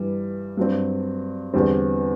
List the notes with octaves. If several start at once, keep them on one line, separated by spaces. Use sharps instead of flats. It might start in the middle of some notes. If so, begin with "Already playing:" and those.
Already playing: G2 E3 G3
G2 F#3 C4
E2 D3 G3 C4